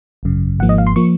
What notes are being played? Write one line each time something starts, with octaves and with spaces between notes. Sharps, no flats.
G#1 F#2 C#3
G#1 G#2 F3 A#3 F#5
D#5
F5
C6
F3 A#3 C#6